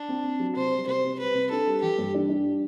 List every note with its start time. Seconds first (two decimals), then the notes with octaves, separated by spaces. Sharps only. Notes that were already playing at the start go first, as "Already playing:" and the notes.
Already playing: D4
0.09 C4
0.24 C4
0.39 F#3
0.56 C3 C5
0.72 G3
0.87 C3 C5
1.03 C3
1.19 G3 B4
1.34 C3
1.50 D4 A4
1.67 G3
1.82 E3 G4
1.98 G2
2.14 D4
2.29 D4